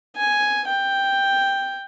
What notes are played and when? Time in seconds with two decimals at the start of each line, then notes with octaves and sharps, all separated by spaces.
0.16 G#5
0.68 G5